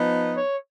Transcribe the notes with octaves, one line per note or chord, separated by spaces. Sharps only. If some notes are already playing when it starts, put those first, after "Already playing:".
Already playing: F3 B3 D#4
C#5